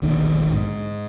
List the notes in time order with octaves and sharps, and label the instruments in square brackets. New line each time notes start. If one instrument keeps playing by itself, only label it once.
[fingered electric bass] E1 A#1 D3 D#3
G#2